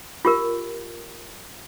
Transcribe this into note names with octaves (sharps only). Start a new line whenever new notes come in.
F4 G4 A#4